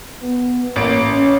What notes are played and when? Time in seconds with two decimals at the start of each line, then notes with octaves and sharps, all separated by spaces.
0.22 B3
0.76 A1 A#3 D7
1.07 C#4